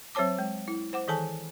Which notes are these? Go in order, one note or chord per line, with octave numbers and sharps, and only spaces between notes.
F#3 C4 C5 C#5 A5 D6
G#3
E4
C5 F#5 D6
D#3 E3 G#4 A4 G#5 A5